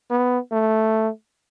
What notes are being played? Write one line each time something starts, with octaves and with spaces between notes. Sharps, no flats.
B3
A3